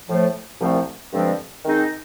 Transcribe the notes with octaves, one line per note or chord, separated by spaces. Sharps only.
A2 F3 A3
C2 A#2 F3 A3 C4
G2 D3 F3 G#3 C4
D#3 G#3 C4 D#4